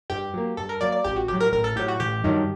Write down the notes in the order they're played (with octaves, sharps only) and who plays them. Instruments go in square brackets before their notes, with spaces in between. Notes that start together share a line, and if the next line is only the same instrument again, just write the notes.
[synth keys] G2 G4
F#3 A#3
G2 A4
A#4
F#3 A#3 D5
D5
A1 G4
F#4
A2 F#3 G4
A#4
A1 A#4
A4
A2 F#3 G4
F#4
A1 G4
G2 D#3 F#3